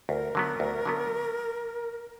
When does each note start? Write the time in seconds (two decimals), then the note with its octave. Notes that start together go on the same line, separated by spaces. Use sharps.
0.09 D2 A#4
0.35 D3 F#3 B3
0.60 D2
0.86 D3 F#3 B3